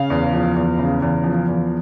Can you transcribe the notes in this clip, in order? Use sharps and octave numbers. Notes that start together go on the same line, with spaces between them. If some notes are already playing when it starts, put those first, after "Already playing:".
Already playing: C#3 F5
E2
F3
E2
C#3
E2
F3
E2